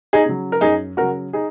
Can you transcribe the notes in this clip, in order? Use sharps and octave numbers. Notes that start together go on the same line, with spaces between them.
D#4 G#4
C#3 F#3
A#4
F#2 D#4 G#4
C#3 F#3 F#4 A#4
D#4 G#4